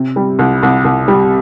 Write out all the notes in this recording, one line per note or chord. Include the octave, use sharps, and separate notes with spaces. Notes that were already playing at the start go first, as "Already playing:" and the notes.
Already playing: C3
G3
C2
C2
C2
G3